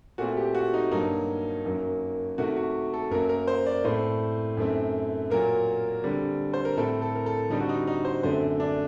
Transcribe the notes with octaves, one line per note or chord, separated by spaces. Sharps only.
A#2 A3 C4 F#4
G4
F#4
D#4
G2 F#3 A#3 D#4
F#2 D#3 F#3 A#3
C3 D#3 A3 F#4
F#4
A4
F#2 F#3 A#3 A#4
A#4
C5
D5
A2 A3 C4 C5
F#2 D#3 A3 C4
A#2 F#3 A#3 A#4
D3 G3 C4
C5
A#4
A2 A3 C4 A4
A4
A#4
A4
D3 G3 C4 D#4
F#4
D#4
D#4
C5
F#2 D3 A3 C4 C5
D4